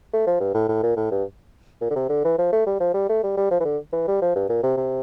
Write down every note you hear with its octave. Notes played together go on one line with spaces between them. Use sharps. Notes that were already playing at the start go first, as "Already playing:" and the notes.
A3
F3
G2
A2
A2
A#2
A2
G2
A#2
D3
C3
D3
E3
F3
A3
G3
F3
G3
A3
G3
G3
F3
E3
D3
E3
G3
F3
G2
A#2
C3
C3